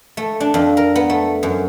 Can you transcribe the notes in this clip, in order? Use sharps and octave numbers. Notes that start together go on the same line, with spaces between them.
A3
D4
F2
A#4
B3
A3
F#2